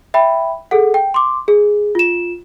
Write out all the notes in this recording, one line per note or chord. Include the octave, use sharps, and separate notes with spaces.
E5 G5 B5
G#4 A4 F#5
G5
C6 D6
G#4
F4 E7